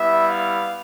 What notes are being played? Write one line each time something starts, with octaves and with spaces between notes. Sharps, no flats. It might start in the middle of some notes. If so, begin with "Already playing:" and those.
Already playing: G3 B3 E4 E5
F5